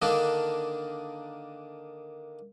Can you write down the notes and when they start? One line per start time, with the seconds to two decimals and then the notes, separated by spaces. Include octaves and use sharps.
0.02 D3 D#3 A#3 D4